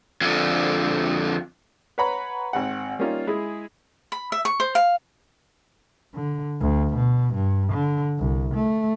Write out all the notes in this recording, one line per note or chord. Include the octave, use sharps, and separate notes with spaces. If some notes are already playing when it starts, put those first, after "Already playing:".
F2 D3
B4 C#5 F#5 A#5 B5
G#1 C4 F#5
G3 A#3 C#4 D#4 F4
G#3 E4 G#4
B5
E5
C#6
C5
F5
D3
D2
B2
G2
D3
C2
A3